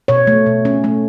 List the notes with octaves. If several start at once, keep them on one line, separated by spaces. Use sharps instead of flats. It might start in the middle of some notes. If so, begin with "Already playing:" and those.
B2 C#5
A3
B2
C#4
A3